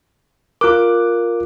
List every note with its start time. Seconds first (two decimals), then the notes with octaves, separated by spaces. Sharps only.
0.61 F4 A#4 D6 F#6